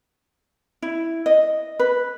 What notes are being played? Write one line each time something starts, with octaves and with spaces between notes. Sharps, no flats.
E4
D#5
B4